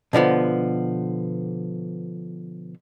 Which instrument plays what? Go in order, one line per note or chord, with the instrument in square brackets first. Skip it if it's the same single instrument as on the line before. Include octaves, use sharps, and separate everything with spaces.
[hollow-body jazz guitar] B2 D3 F3 B3